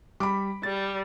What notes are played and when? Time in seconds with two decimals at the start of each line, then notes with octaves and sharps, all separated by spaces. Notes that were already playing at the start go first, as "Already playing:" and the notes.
0.20 G3 B5 D6
0.63 G3 A6